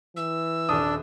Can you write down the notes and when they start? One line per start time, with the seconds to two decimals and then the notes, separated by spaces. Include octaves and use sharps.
0.17 E3 E6
0.69 D#1 D4 D#6